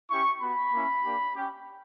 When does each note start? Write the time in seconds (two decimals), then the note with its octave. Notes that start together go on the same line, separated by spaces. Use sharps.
0.10 C#4 E4 G4 C#6
0.41 B3 F#4 B5
0.73 A#3 C#4 E4
1.04 A#3 D4 G4
1.34 C#4 G4